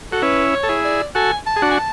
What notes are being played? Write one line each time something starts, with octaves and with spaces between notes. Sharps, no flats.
F#4 A4
C#4 E4 B4
C#5
A4
E4 G#4
D5
F#4 A4 G#5
A5
G#4
D4 F#4
G#5
A5